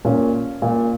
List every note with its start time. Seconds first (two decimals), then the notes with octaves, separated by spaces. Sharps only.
0.05 A#2 C#4
0.62 A#2